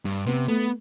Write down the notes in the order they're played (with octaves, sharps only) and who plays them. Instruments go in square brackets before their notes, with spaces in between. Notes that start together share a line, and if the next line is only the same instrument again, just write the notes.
[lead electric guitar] G2
[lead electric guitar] C3 [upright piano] B3
[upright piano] A3 [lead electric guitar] B3